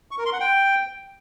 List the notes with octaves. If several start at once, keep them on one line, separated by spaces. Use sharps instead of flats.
C#6
A#4
C6
F#5
G5